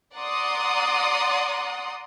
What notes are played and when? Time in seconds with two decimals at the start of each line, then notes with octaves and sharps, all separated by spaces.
0.15 D5 F#5 A#5 C6 D#6